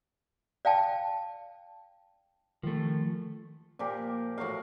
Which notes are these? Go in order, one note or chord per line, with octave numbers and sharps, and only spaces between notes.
D5 F5 G5 A5
D#3 F3 A3
A#2 F3 G4 A#4
A2 F#4 A#4 F5